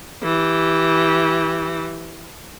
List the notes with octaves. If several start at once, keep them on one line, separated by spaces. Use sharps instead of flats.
E3 G4